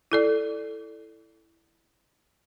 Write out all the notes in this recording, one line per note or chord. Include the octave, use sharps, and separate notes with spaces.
E4 A4 D5